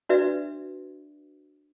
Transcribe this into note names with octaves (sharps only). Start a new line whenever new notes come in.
D4 F#4 B4 D5 E5